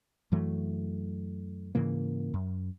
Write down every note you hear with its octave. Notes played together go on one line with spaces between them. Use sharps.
F#2 E3 F#3 A3
G#2 C#3 E3 A#3
F#2